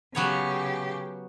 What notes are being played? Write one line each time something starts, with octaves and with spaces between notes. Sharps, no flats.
C#3 F#3 B3 G4 C#5